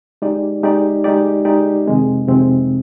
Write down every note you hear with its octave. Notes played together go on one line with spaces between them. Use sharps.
G#3 D#4 G4 D5
G#3 D#4 G4 D5
G#3 D#4 G4 D5
G#3 D#4 G4 D5
F2 C3 D#3 G#3 C4
F2 C3 D#3 G#3 C4